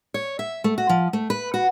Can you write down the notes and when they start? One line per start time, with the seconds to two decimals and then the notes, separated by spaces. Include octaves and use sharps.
0.14 C#5
0.39 E5
0.64 A3
0.78 F#4
0.89 F3
1.13 A3
1.30 B4
1.54 F#4